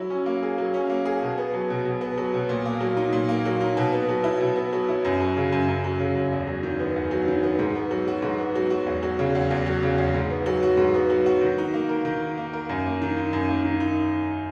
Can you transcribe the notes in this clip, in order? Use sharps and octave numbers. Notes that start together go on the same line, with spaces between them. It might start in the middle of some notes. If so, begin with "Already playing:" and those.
Already playing: F#3 E4
C#4
A#3
G#4
F#3
C#4
A#3
G#4
B2
B3
F#3
B2
B2
B3
F#3
B2
A#2
A#3
F#3
D#4
A#2
A#3
F#3
D#4
B2
B3
F#3
E4
B2
B3
F#3
E4
F#2
F#3
C#3
F#2
F#2
F#3
C#3
F#2
E2
F#3
D#3
B3
E2
F#3
D#3
B3
G#2
B3
F#3
F#4
G#2
B3
F#3
F#4
E2
F#3
C#3
E2
E2
F#3
C#3
E2
G#2
B3
F#3
F#4
G#2
B3
F#3
F#4
D#3
D#4
A#3
A#4
D#3
D#4
A#3
A#4
F#2
A#3
D#3
D#4
F#2
A#3
D#3
D#4